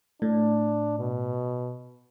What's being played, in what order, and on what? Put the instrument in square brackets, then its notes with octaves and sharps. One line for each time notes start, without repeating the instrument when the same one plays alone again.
[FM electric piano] A2 [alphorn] D4
[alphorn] B2